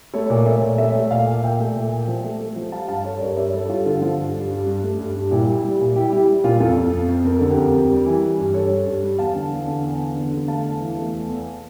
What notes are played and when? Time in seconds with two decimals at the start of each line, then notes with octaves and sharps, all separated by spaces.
0.14 A3 A4 C#5
0.30 A#2 A#4 D5
0.46 A3 C#5 E5
0.62 A#2 A#4 D5
0.78 A3 C#5 E5
0.94 A3
1.11 A#2 D5 F5
1.27 A#2
1.43 A#2 E5 G5
1.59 A3
1.75 A#2
1.91 A#2
2.08 F3
2.24 A3
2.40 A3
2.56 F3
2.72 G3 F5 A5
2.88 G2 F5 A5
3.04 G3 A4 C#5
3.21 G2 A#4 D5
3.31 D5
3.37 G2 C#5 E5
3.53 G3 A4 C#5
3.69 G2 F4 A4
3.86 D3 F4 A4
4.01 F3 F4 A4
4.17 G2
4.34 G2
4.50 G2
4.66 G2
4.82 A3
4.99 G2
5.15 G2
5.31 A#2 E4 G4
5.47 G3
5.64 G3
5.80 A#2
5.96 G3 E4 G4
6.12 G3 E4 G4
6.28 G3
6.44 A#2 F4
6.60 F2 F4 A4
6.76 F2
6.93 F2
7.09 F2
7.25 F2 A#4
7.37 D3 A4
7.49 G4 A#4
7.57 F2
7.74 F2
7.90 G3
8.06 E3
8.22 G3
8.38 G2
8.54 G2 A4 C#5
8.70 G3
8.86 G2
9.03 G3
9.19 E2 F5 A5
9.35 D3
9.51 E2
9.67 D3
9.84 E2
10.00 E2
10.16 D3
10.32 D3
10.48 A3 F5 A5
10.64 E2
10.80 E3
10.97 A3
11.13 E2
11.29 E2